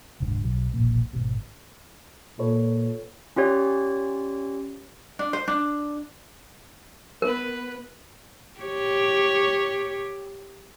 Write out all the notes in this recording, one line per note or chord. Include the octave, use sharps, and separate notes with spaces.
F1 D2 G#2 D3
B1 F#3
E1 A#1 A#2 A#3
G#1 B2
A#2 A4 B4 C#5
C#4 F4 G4 C#5 D5
D4
C5
D4
B3 A#4 B4
G4 C#5